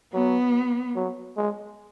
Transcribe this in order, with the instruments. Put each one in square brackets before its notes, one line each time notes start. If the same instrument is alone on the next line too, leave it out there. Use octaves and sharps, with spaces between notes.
[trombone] F#3 [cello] B3
[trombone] F#3
G#3